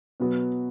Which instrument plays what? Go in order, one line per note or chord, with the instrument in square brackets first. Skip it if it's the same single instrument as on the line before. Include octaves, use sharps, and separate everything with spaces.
[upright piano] B2 F#3 B3 F#4